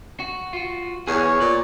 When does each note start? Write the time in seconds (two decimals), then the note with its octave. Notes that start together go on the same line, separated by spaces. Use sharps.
0.20 F#4
0.53 F4 F#4
1.07 E2 G#4 C#5
1.40 A#2 D5